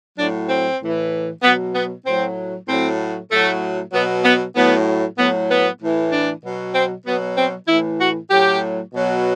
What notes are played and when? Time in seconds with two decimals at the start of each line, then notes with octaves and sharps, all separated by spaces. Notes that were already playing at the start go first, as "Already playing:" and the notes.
0.18 A2 F#3 D4
0.49 C4
0.80 A2 E3
1.43 B2 F#3 B3
1.74 B3
2.05 A2 F#3 C4
2.68 A2 F#3 C4
3.30 A2 F#3 A3
3.92 B2 F#3 B3
4.24 B3
4.55 A2 F#3 B3
5.18 A2 F#3 B3
5.49 B3
5.81 A2 E3
6.12 D4
6.43 B2 F#3
6.74 C4
7.05 B2 F#3 B3
7.37 C4
7.68 A2 E3 E4
7.99 F#4
8.30 A2 F#3 G4
8.93 B2 F#3